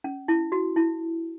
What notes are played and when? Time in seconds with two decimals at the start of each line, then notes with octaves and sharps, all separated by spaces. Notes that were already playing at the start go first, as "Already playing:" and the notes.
0.04 C#4
0.28 E4
0.52 F#4
0.76 E4